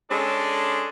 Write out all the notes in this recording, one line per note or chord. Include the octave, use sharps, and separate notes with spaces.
G#3 C#4 D4 A4